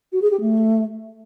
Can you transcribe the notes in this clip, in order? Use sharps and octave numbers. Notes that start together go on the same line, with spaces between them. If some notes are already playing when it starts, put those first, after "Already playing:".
F#4
G#4
G4
A3